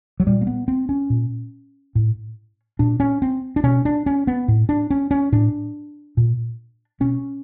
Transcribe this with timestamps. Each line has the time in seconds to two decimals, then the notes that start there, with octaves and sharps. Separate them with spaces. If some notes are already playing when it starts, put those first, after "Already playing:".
0.20 F#3
0.27 A#2 G3
0.41 A#3
0.47 B3
0.68 C4
0.89 C#4
1.10 A#2
1.95 A2
2.79 A#2 D4
3.00 C#4
3.22 C4
3.56 D4
3.63 B2 C#4
3.85 D4
4.06 C#4
4.27 B3
4.48 A2
4.69 D4
4.90 C#4
5.11 C#4
5.32 A2 D4
6.17 A#2
7.00 B2 C#4